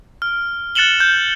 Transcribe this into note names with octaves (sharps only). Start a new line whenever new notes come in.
F6
F#6 A6 C#7 E7 F#7 G7
G6